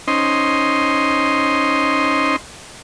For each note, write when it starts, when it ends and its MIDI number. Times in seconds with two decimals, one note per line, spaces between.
0.08 2.36 61
0.08 2.36 63
0.08 2.36 72
0.08 2.36 75
0.08 2.36 84